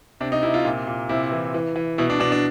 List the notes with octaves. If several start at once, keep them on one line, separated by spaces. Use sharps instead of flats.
C3 D4
D#4
C3 E4
F4
A#2
A#2
C3 E4
E3
E3
E3
B2 E4
D4
B2 D4
D4